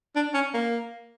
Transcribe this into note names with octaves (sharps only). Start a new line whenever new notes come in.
D4
C#4
A#3